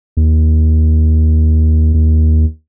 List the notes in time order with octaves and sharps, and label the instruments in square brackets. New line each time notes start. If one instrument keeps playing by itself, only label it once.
[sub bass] D#2
D#2